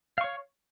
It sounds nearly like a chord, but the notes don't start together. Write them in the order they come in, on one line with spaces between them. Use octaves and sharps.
F5 C#6 C#5